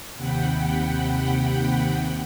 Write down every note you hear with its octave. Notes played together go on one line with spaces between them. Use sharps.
D#2 C3 F#5 G5 B5